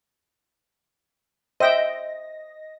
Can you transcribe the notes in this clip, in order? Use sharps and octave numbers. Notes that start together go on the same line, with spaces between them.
C5 D#5 E5 G5 A#6